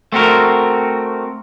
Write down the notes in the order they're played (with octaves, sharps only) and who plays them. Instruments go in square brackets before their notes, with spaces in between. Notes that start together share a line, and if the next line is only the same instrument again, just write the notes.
[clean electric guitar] A3 C4 F#4 A#4